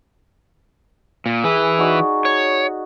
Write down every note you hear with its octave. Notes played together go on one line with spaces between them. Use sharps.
A#2
E3 E4 G#4
D#4 F#4 D5
C#5